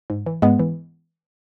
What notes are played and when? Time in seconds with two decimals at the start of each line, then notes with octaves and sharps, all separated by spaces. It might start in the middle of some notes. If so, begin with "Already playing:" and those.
0.10 G#2
0.26 E3
0.42 G#2 G#3 B3
0.59 E3